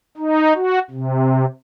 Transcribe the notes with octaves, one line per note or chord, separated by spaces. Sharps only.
D#4
F#4
C3